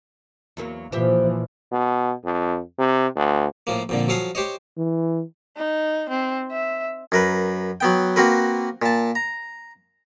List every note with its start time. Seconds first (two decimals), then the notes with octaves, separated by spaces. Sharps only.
0.57 E2 F#3 A#3
0.92 A#2 E3 F3 G4 C5 E5
1.72 B2
2.25 F2
2.78 C3
3.16 D2
3.67 A2 F3 A#3
3.89 F2 A#2 D3
4.08 F3 F#3 A4 F5 G#5 D#6
4.35 G4 C5 C#5 D#5
4.77 E3
5.57 D#4
6.09 C4
6.51 E5
7.12 F#2 A#4 B4
7.81 F#3 B3 G5
8.16 A#3 C4 F#4 A#4 B4
8.82 A#2 A5
9.15 A#5